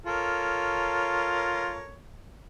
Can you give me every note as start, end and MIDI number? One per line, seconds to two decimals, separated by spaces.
0.06 1.78 65
0.06 1.94 69
0.06 1.94 70
0.06 1.94 73